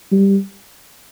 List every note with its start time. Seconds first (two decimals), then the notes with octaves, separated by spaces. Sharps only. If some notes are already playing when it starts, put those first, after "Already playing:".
0.12 G3